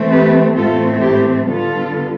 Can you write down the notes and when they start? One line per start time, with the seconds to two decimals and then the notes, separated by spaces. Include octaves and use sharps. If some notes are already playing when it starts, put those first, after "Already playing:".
Already playing: E3 A3 C4
0.11 G4 B4
0.56 A2 E3 A3 C4 F4 A4
1.01 E4 G4
1.46 D3 G3 B3 F4 A4